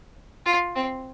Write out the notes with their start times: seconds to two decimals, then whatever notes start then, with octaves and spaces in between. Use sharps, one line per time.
0.46 F4
0.76 C4